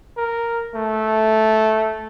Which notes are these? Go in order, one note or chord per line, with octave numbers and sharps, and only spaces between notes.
A#4
A3